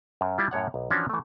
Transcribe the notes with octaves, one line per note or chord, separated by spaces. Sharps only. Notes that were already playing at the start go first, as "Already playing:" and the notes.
F#2
G3 E4 F4
F#2 A2 C#5 F#5
B1
E3 F3 C#4 D4 F#4
E3 A3